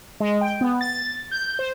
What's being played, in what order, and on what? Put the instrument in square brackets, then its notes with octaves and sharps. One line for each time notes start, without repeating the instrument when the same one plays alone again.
[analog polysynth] G#3
G5
B3
A6
G6
C5